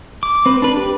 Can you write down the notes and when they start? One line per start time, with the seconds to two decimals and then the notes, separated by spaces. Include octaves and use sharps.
0.23 D6
0.46 C4 B4
0.62 D4 B4
0.77 G4